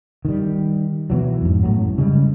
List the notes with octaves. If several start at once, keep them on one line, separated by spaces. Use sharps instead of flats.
D#3 G3
B2 E3 F#3
F2 G#2
F#2 A2 F#3
C#3 G3 G#3